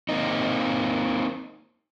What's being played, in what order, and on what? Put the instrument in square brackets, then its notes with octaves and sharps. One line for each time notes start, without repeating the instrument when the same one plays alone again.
[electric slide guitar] A#3 C4 D#4